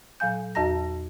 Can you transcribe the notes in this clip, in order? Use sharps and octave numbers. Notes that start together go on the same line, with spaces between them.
A#2 F#3 F5 G#5 G6
E2 F#4 D#5 A5 A#5 A#6